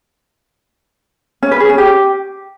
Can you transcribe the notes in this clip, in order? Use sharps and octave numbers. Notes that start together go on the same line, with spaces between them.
C#4
B4
G#4
C#4
G4